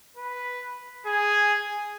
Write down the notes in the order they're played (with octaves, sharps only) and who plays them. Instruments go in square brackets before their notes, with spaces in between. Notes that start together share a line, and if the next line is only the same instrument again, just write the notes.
[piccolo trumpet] B4
G#4